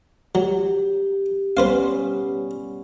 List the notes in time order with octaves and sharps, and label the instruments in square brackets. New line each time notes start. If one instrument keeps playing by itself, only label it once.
[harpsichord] F#3 [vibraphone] G4
[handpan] G3 B3 C#4 [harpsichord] B4 C5 F5